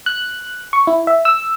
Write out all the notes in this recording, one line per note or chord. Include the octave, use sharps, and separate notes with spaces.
F#6
C#6
E4
E5
E6